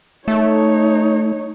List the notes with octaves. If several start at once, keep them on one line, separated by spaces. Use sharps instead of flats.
A3 D#4 C#5